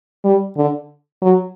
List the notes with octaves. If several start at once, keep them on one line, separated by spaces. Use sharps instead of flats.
G3
D3
F#3